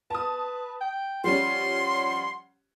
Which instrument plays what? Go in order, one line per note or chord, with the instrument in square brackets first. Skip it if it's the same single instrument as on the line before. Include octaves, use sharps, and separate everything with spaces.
[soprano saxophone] B4 [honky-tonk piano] A5 D#6
[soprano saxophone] G5
[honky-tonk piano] F3 G3 C#4 [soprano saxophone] F#5 [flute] C6